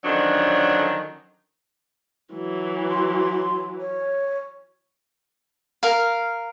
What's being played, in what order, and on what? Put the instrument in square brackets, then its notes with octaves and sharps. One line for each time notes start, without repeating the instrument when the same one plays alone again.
[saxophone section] D3 D#3 F3 F#3 C#4 D4
[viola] E3 F#3
[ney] C6
C#5
[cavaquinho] A#4 F5